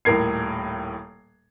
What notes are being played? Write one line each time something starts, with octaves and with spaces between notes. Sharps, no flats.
D#1 A2 A#4 G#6 C7